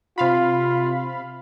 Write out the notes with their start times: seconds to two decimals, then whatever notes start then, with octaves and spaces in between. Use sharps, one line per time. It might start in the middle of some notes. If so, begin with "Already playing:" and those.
0.18 C3 F4 F5 B5